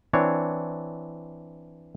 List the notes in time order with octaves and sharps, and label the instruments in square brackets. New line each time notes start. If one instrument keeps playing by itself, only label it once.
[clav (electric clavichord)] E3 C4 D4 C#5